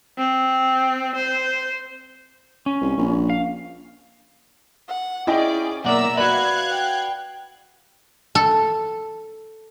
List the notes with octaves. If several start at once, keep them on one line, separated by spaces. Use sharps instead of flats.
C4
C5
C#4
C2
A#1
F5
F#5
C#4 E4 G#4 D5 D#5 G5
B1 A#3 A#4 D5 E5 F#5 A#5 E6
F#4 B4 D5 F5 F#6 G#6
G5
A4